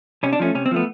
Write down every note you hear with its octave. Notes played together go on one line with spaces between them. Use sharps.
C3 C#4
D4
F3 A3 C#4
C3 C#4
C4
F3 A3 B3